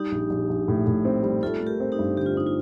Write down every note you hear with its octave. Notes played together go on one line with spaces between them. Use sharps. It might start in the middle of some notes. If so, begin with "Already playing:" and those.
Already playing: G3 D#4 G4
A#1
A#1
A#1
A2
A2
C4
G3
A3 F4 A4
A3
G4 A#4
C4
D#4 G4
G2
D3 G4
F4
C4 D#4
F4